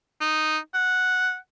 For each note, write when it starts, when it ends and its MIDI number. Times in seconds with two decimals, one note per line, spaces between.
0.21 0.58 63
0.74 1.36 78